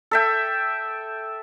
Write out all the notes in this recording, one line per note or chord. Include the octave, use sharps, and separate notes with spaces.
A4 E5 G5